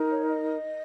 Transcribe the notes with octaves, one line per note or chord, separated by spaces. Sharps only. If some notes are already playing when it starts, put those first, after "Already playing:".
Already playing: D#4 A#4
C#5
D#5